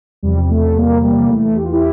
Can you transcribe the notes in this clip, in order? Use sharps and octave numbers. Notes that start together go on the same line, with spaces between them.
E2 C3 F3 G3
G3
A3
G3 A#3
G3 A#3
E2 E3 A3
G4
F4
E4 G4